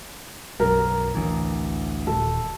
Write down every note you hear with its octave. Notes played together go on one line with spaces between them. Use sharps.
B1 F#2 A#4
A1 D2 E3
D#1 A4